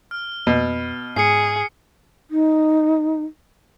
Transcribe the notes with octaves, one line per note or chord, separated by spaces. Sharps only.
F6
F2 B2
G#2 G#4 C7 C#7
D#4